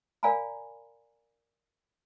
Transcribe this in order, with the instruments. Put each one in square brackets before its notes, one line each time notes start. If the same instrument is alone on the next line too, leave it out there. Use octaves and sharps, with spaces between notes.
[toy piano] A#4 D5 F5 G#5 A#5 B5